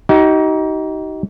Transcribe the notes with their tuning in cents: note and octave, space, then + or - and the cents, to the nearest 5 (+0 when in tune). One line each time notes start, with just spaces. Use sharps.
D#4 +20 G4 -45